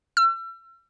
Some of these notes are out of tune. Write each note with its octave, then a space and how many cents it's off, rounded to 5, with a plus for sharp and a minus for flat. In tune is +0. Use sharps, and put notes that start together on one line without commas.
E6 +40